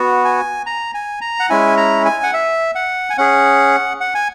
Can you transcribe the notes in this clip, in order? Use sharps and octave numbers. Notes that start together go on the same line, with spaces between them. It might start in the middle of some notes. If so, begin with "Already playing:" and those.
Already playing: B3 F#4
G#5
A#5
G#5
A#5
F#5
G#3 C#4 E4 G#5
A#5
G#5
F#5
E5
F#5
G#5
C#4 G#4 F#5
F#5
G#5